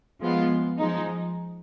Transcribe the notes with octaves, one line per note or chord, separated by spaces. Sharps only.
F3 G#3 B3 F4
F3 G#3 D#4